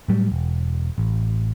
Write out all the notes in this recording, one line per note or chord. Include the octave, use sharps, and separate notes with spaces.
A2 F#3 G3
E1
A1